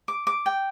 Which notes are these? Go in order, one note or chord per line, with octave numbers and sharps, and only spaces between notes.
D6
D6
G5